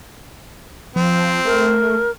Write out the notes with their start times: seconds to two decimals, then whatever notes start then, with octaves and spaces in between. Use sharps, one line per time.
0.96 F3 C4
1.45 A3 A#4